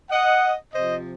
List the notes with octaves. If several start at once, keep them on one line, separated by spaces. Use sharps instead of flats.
D#5 F#5
C3 F3 C5 D#5